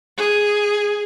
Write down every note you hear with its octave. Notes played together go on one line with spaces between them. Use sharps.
G#4